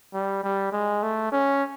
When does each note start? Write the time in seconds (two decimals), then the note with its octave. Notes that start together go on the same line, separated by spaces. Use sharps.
0.14 G3
0.43 G3
0.72 G#3
1.03 A3
1.32 C#4